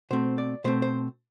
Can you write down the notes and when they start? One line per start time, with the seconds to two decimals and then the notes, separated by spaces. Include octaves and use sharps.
0.11 B2 A3 C4 C5
0.38 D5
0.64 B2 A3 C4 C5
0.82 C5